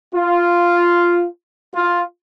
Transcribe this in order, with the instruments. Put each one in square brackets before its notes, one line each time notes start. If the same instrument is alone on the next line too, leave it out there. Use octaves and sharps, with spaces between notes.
[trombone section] F4
F4